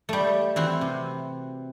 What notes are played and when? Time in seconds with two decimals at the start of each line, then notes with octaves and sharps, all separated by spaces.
0.09 G3 A3
0.56 E3 C4 F#4
0.81 C3